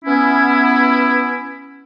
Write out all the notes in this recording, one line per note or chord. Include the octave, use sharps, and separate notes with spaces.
B3 C#4 E4